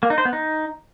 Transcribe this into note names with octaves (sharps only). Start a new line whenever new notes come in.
A#3
D#4
C5
B3
D#4